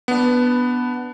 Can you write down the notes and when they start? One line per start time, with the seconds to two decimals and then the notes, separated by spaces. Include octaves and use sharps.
0.08 B3 D4